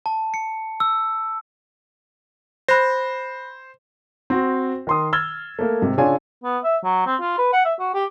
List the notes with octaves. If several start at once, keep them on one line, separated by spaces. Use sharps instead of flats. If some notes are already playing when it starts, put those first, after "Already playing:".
A5
C#7
E6
C5 B5 F#6 A#6
C4 F#4 C5
D#3 C6 D#6
E6 F6 G#6 A6 G7
A3 A#3
G#2 C3
C#3 D4 F4 C#5 G#5
B3
E5
F#3
C4
F4
B4
F#5
E5
F#4
G4